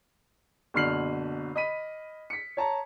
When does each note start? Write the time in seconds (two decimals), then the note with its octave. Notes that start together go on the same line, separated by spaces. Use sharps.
0.74 F#1 B2 D3 F6 C7 F#7
1.56 D#5 B5 B6 D#7
2.30 B6 C#7
2.57 C#5 A5 A#5